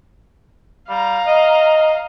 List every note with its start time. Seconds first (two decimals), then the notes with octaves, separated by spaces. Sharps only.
0.89 G3 F5 A#5
1.26 D#5